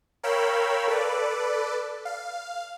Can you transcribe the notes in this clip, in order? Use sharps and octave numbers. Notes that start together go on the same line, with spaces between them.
A#4 C#5 F5 G5 B5 E6
A4 B4 D5
F5